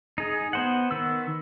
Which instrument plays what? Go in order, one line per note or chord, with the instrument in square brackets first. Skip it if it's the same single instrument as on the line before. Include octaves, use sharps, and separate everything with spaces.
[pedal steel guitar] D#4 G#4
B3 C5 F#5
D#3 B3 E6